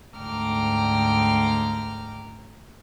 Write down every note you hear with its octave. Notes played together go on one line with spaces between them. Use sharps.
D2 G#2 G5 A#5 D6 F6